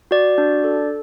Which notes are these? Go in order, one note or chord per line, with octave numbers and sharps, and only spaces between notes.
F#4 D5
D4
A4